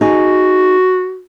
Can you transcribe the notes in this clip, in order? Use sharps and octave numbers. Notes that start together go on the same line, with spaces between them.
D#4 F#4 G#4